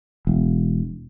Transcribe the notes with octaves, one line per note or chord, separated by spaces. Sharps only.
E1